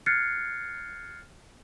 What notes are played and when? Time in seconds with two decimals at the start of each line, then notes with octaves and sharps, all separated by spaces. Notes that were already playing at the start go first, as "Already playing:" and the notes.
0.06 F6 F#6 G#6 A6 C7 C#7